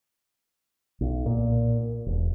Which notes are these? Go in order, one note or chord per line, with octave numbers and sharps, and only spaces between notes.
B1
A#2
E1